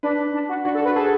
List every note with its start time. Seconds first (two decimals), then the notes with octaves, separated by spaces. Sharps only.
0.03 D4 B4
0.34 D4
0.49 F#4
0.64 D4 F#4
0.75 A4
0.80 F#4 B4
0.96 G#4 A4